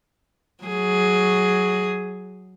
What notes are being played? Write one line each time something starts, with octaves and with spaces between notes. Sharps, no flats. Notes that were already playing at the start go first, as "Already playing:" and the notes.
F#3 G#4